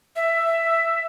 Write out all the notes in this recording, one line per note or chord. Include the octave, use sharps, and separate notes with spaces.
E5